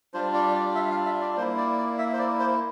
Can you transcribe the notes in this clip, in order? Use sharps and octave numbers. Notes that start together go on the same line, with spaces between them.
G3 D4 F4 C5
D5
D5
E5
F5
E5
D5
A#3 E4 C5
D5
D5
E5
C5
D5
C5